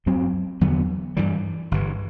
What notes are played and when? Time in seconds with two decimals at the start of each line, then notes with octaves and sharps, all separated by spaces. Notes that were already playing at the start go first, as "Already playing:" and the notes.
0.06 F#2 F#3 C4
0.61 E2 D3 F#3 B3
1.17 G2 E3 G3
1.71 G1 G2 E3